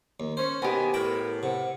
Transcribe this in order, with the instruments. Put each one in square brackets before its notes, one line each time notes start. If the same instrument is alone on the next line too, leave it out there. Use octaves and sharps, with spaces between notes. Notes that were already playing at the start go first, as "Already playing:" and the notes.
[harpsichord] D#2
[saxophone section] C#4 [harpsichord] C5
[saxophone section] B2 D#3 [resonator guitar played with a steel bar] B3 G4 [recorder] G#5
[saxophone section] A2 [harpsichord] E4 G5 [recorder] A#4
[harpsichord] C3 [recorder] F#5